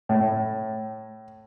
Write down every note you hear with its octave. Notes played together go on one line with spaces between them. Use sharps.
A2